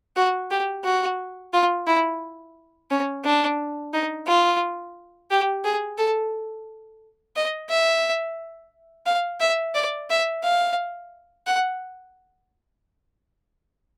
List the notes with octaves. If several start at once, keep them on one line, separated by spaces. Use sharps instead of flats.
F#4
G4
F#4
F4
E4
C#4
D4
D#4
F4
G4
G#4
A4
D#5
E5
F5
E5
D5
E5
F5
F#5